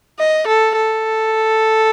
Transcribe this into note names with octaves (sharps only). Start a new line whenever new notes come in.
D#5
A4
A4